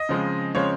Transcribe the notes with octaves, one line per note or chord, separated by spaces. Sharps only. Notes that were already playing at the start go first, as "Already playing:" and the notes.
Already playing: D#5
C#3 F3 G#3 C4
C#3 F3 G#3 C4 C#5